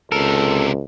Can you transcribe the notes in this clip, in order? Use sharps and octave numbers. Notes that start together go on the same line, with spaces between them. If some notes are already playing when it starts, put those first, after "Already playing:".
C#2 C3 A4 A#4